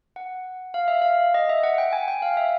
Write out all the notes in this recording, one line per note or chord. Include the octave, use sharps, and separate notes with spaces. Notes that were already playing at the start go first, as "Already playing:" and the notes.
F#5
F5
E5
F5
D#5
E5
F#5
G5
G#5
G5
F5
E5